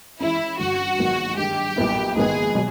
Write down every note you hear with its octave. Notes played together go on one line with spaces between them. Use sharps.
E3 G#3 C#4 E4
G1 G2 D3 F#4
A#1 G#2 D#3 F#3 B3
G2 D#3 G#3 G4
B1 A#2 G3 B3 E4
A#1 G#2 D#3 G#3 B3 G#4
B2 F#3